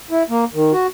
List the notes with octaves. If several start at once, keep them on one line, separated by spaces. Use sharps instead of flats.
E4
A#3
D#3
F#4